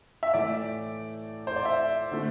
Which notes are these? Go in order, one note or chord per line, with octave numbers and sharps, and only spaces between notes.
E5
A2 E3 A3 D5
C5
D5
E5
D3 A3